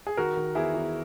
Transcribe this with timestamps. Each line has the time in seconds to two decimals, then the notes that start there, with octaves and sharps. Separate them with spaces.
0.07 G#4
0.17 D#3 F#4 A#4
0.37 D#3
0.55 E2 E4 G#4
0.74 E2